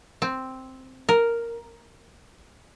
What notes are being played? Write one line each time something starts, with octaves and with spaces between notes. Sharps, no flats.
C4
A#4